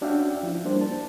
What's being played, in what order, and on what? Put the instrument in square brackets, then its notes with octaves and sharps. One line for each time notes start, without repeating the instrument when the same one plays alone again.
[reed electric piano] C#4 D4 F#4 E5 F5 G5
F3 E4
G3 A#3 D4 C5
A5